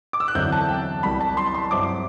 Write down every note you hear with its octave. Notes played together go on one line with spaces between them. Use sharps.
D6
E6
F#6
E2 D3 F#3 C4 E4 G6
A5
G5
C2 C3 F#3 B5
A5
C6
C6
G2 F#3 C4 E4 D6